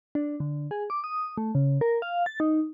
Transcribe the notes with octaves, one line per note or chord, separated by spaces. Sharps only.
D4
D3
G#4
D6
D#6
A3
C#3
A#4
F5
A6
D#4